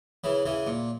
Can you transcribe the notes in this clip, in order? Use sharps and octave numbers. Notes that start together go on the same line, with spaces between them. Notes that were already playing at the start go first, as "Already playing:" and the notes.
C#3 E3
C#3 E3
A#2